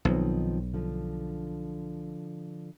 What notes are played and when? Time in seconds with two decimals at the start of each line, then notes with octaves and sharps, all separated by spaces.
0.05 B1 D#3 F3 C4
0.74 D3 F3